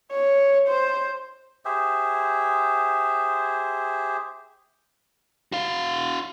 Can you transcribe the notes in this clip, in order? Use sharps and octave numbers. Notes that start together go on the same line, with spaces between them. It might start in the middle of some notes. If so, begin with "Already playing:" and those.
C#5
C5
G4 G#4 C5 E5
F#4 F5